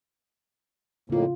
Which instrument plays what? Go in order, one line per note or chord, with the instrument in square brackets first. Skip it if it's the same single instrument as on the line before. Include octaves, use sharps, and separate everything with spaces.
[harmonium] F2 A2 A#3 [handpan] C#3 F4